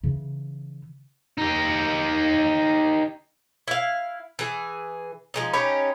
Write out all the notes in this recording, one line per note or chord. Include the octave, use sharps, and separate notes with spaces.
C#3 E3
D#4 G4
E4 F5
E3 G#4
F3 G#3 D#4
C#4 D#4 G4 B5